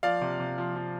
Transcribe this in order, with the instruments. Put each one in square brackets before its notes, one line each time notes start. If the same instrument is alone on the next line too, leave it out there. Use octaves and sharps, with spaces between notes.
[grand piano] F3 D5 F5
C3
C3
F3
F3